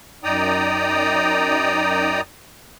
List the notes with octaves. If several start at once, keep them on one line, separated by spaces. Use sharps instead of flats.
F#2 D#4 D5 G5 A#5 D#6